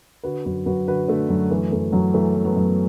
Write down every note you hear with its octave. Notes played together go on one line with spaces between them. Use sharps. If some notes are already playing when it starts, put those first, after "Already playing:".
D3 F#4 B4
F#2 F#4 B4
F#2 F#4 B4
D3 F#4 B4
D3 A3
F#2 F#3
E3 A3
F#2 A3
F#2 F#3
E3 A3
E3
F#3 B3
F#2